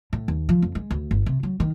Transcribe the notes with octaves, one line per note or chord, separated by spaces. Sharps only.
A2
D#2
F3
F2
G#3
D2
G1
C3
F#3
D#3